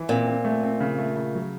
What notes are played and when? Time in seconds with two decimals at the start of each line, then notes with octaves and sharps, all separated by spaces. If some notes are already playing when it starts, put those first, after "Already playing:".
Already playing: E3
0.09 A#2 C4
0.27 C4
0.45 A3
0.63 C4
0.80 C#3
0.98 A3
1.16 C#3
1.35 F#3